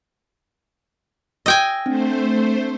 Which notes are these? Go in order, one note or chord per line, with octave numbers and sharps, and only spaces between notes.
D#5 G5 G#5 E6
A3 C4 D4 C5